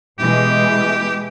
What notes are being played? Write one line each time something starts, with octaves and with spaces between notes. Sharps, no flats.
B2 E3 G#3 G4